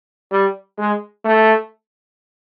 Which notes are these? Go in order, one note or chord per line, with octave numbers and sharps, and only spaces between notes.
G3
G#3
A3